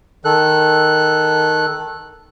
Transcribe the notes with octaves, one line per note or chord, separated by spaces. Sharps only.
D#3 A4 F#6